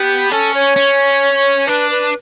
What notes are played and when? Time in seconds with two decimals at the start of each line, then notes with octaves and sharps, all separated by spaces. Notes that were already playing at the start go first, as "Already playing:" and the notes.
Already playing: B3 G4
0.31 C#4 A4
0.54 C#5
0.76 C#4
1.67 D4 B4
1.90 B4